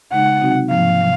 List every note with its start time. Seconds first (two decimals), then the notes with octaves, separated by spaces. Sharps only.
0.12 C#3 G#3 D#4 F#5
0.41 C3 F#3 C4 D#4 F#4
0.70 G#2 F3 A#3 F5
1.01 C3 F#3